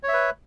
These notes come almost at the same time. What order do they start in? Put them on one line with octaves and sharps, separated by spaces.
C#5 E5 B4